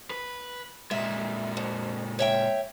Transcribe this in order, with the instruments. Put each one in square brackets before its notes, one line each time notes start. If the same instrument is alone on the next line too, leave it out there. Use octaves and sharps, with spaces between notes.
[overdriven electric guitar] B4
[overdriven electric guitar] A#2 G#3 [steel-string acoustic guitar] E5
[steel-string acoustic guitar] F2
C#5 E5 G5